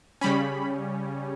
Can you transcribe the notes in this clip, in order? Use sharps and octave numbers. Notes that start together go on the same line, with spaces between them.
C#3 G3 C#4 B5